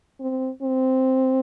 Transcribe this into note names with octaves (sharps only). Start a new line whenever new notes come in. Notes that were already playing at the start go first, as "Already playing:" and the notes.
C4
C4